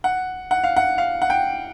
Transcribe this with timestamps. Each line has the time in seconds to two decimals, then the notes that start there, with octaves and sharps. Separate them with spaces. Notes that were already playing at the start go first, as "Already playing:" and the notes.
0.04 F#5
0.51 F#5
0.63 F5
0.77 F#5
0.98 F5
1.22 F#5
1.30 G5